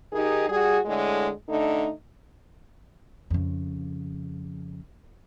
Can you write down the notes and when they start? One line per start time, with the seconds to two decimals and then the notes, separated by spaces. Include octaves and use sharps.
0.13 D#3 D#4 G4 G#4
0.49 G3 F#4 G#4
0.86 A2 D3 G#3
1.49 D3 A3 D#4
3.30 F2 C#3